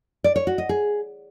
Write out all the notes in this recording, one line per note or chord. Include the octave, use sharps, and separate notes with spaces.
D5
C#5
F#4
D#5
G#4